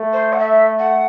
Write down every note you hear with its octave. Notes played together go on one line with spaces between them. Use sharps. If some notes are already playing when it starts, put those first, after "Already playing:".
Already playing: A3
C5
F#5
E5
F#5